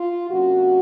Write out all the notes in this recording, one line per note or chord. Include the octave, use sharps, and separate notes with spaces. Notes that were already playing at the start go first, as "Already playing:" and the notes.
Already playing: F4
C3 F#3 A#3 C#4 F#4